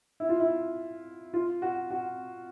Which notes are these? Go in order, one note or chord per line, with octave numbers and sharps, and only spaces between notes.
E4
F4
E4
F4
F#4
F#4